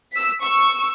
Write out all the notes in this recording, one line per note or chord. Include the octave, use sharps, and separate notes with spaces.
E6 B6
C#6 E6